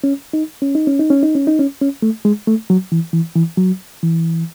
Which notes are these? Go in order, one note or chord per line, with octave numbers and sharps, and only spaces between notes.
C#4
D#4
C#4
D#4
C#4
D#4
C#4
D#4
C#4
D#4
C#4
C#4
A3
G#3
A3
F#3
E3
E3
E3
F#3
E3